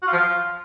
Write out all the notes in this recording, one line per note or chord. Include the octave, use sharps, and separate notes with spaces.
F#4
F4
F3
F4